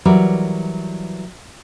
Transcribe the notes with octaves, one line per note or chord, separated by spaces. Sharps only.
E3 F#3 G3 A#4 B4 D5